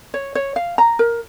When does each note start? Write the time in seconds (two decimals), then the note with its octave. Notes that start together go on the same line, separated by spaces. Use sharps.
0.14 C#5
0.35 C#5
0.56 F5
0.78 A#5
0.99 A#4